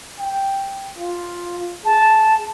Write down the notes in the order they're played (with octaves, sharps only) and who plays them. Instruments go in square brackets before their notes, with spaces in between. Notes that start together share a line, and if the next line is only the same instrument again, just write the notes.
[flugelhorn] G5
F4
[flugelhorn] G#4 [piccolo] A5